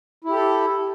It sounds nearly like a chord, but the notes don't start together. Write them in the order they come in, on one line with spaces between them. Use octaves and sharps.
E4 G4 A4